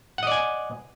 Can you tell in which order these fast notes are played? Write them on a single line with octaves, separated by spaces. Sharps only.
F#5 D#5 D5 G#5